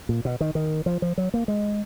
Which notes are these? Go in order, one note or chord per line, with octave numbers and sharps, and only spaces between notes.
A#2
B2
D#3
D#3
F3
F3
F#3
A#3
G#3